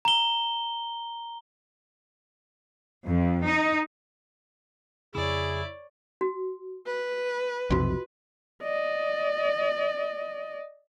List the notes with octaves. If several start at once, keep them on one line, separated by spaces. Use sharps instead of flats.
A#5 G7
F2
D#4
F2 C#3 E4 G#4 C#5 D5
F#4
B4
B1 F2 C3 F4 F#4 D#5
D5 D#5